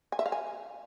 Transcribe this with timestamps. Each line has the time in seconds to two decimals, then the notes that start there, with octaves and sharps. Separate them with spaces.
0.12 G#5
0.19 E5
0.26 F5
0.32 G#5